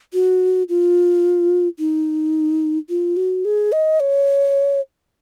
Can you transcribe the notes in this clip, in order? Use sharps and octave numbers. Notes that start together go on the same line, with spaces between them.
F#4
F4
D#4
F4
F#4
G#4
D#5
C#5